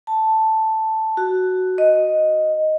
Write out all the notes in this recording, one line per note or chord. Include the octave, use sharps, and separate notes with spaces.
A5
F#4
D#5